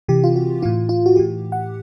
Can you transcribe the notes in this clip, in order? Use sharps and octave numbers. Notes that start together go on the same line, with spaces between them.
C3 E3 G4
F4
F#4
A2 E3 F4
F4
F#4
A2 E3 G4
F#5